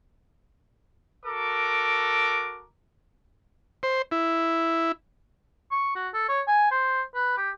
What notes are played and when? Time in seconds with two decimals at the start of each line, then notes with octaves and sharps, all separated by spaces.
1.26 F#4 A4 A#4 D6
3.83 C5
4.12 E4
5.71 C#6
5.95 F#4
6.14 A4
6.28 C#5
6.48 G#5
6.72 C5
7.15 B4
7.37 G4